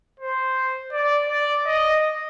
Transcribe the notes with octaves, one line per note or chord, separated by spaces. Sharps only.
C5
D5
D5
D#5